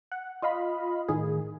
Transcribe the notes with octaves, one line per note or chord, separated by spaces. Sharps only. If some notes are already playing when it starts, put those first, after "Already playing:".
F#5
F4 D#5 F5 B5
A2 D#3 G#4